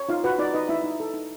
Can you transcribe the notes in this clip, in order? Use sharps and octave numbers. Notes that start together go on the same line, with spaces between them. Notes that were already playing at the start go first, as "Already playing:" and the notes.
Already playing: C#5
D#4 F4 F5
F#4 B4 F#5
D#4 D5
D#4 B4 D#5
D#4 E4 E5
D#4
A4
D#4